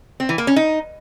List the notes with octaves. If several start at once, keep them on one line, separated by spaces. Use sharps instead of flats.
C4
E3
A#3
C#4
D#4